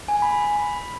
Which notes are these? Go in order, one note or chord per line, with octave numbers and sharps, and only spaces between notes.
G#5
B5
B5